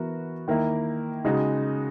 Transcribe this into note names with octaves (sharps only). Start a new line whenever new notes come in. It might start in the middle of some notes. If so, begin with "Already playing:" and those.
Already playing: E3 B3 F#4 A#4
D#3 A#3 E4 A#4
C#3 G#3 D#4 F#4